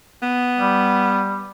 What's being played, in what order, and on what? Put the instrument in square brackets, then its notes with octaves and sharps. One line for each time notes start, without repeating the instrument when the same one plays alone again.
[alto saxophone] B3
[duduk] G3